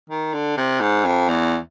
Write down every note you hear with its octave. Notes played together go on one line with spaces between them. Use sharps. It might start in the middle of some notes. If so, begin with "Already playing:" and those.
D#3
D3
C3
G#2
F2
E2